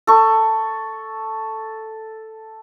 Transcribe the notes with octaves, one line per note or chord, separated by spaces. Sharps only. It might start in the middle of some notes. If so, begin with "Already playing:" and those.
A4 C#6